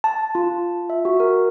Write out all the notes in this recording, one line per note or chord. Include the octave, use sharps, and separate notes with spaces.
A5
F4
E5
F#4
A#4